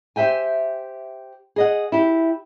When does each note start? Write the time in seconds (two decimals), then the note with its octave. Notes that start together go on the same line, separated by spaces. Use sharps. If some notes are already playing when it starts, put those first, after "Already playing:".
0.16 G4 C5 E5 G5 G#5
1.56 G#4 D#5 F#5
1.92 E4 G4